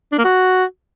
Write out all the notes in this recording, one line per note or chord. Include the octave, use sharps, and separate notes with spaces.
D4
A#3
F#4